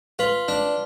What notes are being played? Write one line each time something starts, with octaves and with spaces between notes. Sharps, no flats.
F4 B4
D4